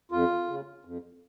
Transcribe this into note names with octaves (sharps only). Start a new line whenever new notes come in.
F2 F4
C#3
F2